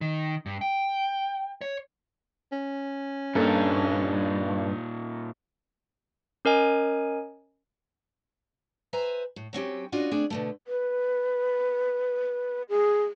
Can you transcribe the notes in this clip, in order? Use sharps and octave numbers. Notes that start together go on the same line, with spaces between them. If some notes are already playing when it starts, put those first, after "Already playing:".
D#3
G2
G5
C#5
C#4
G2 A#2 A#3 D#4 A4
C#4 A#4 D#5 G#5
B4 C5 E5 G#5 A#5
A2
F#3 C4 C#4 G4
C#4 D4 F4 F#4 D#5
A3 C4 D4 G#4
B2 D3 A3
B4
G#4